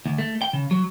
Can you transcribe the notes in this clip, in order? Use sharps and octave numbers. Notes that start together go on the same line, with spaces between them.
D2
A3
G5
C#3
F#3